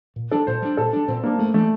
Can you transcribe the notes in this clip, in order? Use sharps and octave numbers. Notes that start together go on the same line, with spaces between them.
A#2
G3 D4 A4
A#2 C5
G3 D4
A#2 A4
G3 D4
A#2 C4
G3 A#3 D4
G2 A3
E3 G3 A3